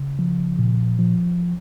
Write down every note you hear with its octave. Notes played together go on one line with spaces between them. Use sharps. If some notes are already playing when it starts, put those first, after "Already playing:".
Already playing: C#3
F3
A#2
F3